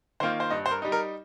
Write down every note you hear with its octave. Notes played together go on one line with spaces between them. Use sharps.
D#3 A#3 F4 C5
C5
G2 D#5
C5
A#4
G3 D#4
A#4